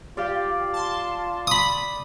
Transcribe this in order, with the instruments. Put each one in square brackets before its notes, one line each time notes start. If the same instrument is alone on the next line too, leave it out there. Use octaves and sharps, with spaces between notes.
[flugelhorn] F4 [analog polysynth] G4 [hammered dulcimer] D5 F5
[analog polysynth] A5 C6
[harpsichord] B5 D#6